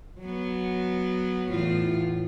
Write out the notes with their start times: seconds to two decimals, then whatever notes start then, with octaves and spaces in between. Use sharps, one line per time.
0.20 F#3 B3
1.49 E2 A2 F4